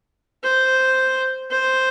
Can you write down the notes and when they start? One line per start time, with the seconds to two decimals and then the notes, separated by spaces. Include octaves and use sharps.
0.44 C5
1.52 C5